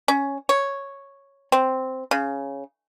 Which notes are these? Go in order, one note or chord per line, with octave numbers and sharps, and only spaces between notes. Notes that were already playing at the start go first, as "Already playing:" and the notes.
C#4
C#5
C4
C#3